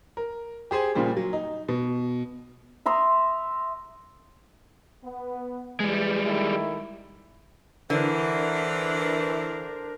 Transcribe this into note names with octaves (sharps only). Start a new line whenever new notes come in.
A#4
G4 G#4 C5 G#5
A#2 C#3 F3 G3 A#3
F#3
D#4
B2
E5 A#5 C6 D#6
B3
E3 G3 G#3
D#3 A3 E4
D3 E3 D4 A#4 C5